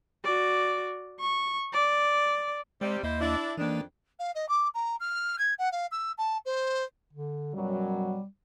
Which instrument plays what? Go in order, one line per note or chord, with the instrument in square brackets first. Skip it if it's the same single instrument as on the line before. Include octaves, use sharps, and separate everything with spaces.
[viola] F#4 D5
C#6
D5
[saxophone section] C3 G3 [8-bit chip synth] G#3
[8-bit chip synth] D#2 A#3 D#5 [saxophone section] E4 C5
[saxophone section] D4 E4
[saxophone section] F2 D#3 D4 [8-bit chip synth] E3 A#3
[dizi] F5
D#5
D6
A#5
F6
G#6
F#5
F5
E6
A5
C5
[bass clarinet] D3
[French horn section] F#2 B2 F#3 [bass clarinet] G3